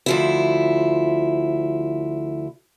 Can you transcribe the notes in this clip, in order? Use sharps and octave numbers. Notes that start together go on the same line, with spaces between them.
D2 F3 E4